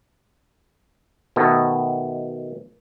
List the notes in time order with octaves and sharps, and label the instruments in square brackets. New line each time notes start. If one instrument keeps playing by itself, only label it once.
[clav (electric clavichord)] B2 D#3 A3 B3